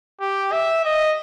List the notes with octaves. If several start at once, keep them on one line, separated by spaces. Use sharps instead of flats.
G4
E5
D#5